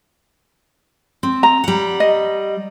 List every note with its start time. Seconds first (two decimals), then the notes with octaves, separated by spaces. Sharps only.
1.23 C4
1.43 A#5
1.64 G3 F#5
2.00 D#5